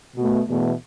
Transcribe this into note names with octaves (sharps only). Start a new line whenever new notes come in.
B2 A3
E2 B2 A3